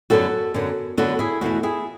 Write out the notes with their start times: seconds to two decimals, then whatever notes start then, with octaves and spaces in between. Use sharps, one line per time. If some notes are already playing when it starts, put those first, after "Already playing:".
0.10 F#2 D3 F#3 B3 F#4 A4
0.54 F#2 D3 F#3 B3
0.98 F#2 D3 F#3 B3 F#4 A4
1.19 E4 G#4
1.41 E2 B2 A3 E4 F#4
1.63 E4 G#4